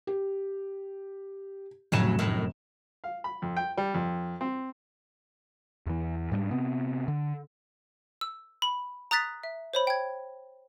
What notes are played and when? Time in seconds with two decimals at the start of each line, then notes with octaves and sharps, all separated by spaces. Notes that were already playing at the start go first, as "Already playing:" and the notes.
0.07 G4
1.92 F1 A2 C#3 F#3 E7
2.19 F#2 A2 D#3
3.04 F5
3.24 B5
3.42 F2
3.57 G5
3.77 G3
3.94 F2
4.41 C4
5.86 E2 E3
6.32 G#2 G3 A#3 D4
6.51 C3 B3 C4
7.08 D3
8.21 E6
8.62 B5
9.11 A#5 D#6 F#6 A6 B6
9.43 E5
9.74 C5 C#5 B5
9.87 G5 G#6